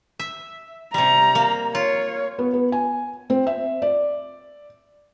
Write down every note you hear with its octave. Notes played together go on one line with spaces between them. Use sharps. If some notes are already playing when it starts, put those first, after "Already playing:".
E5
C3 G3 A#5
A#3
F4 C#5
B3
B3
G#5
C4
E5
D5